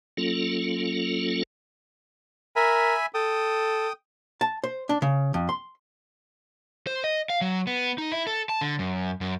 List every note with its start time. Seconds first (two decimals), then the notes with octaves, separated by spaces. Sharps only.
0.17 F#3 A#3 C#4 F4 A4
2.56 A#4 E5 G#5 B5
3.14 A4 G5 D#6
4.41 A5
4.64 C5
4.89 D4
5.02 C#3
5.34 F2
5.49 C6
6.87 C5
7.04 D#5
7.30 F5
7.41 F#3
7.67 B3
7.98 D#4
8.12 E4
8.27 A4
8.49 A5
8.61 D3
8.79 F#2
9.21 F#2